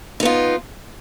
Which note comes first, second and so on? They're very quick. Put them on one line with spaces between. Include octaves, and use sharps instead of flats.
D#4 B3 F4